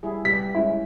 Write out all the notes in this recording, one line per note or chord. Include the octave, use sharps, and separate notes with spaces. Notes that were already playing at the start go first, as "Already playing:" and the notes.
G3 E4 G#4
G3 B4 B6
G#3 C#4 E4